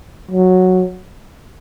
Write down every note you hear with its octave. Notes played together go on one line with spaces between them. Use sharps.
F#3